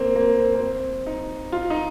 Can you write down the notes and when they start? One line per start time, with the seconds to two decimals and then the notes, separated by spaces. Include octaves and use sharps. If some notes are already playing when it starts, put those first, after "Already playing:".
Already playing: A#3 C4
0.16 A#3
0.39 C4
0.55 A#3
0.61 C4
1.07 D#4
1.52 F4
1.70 D#4